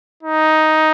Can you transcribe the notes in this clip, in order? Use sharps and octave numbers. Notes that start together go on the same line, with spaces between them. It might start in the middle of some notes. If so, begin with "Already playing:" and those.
D#4